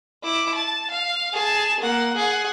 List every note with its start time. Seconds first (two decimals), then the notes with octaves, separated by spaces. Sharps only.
0.23 E4 D6
0.54 A5
0.90 F5
1.33 G#4 A5
1.80 A#3 F#5
2.16 G#4 F#5